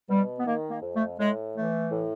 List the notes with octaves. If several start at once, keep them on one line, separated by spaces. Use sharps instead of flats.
B2 G3
B3
D#3 A#3
A#3
F2
A3
A2 G#3
E3 A3
A2